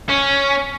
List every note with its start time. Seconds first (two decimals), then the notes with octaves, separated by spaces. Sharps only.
0.09 C#4